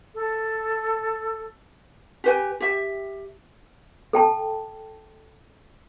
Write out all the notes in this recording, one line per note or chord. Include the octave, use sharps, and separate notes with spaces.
A4
G4 B4 G#5
G4 E5
A4 G5 A5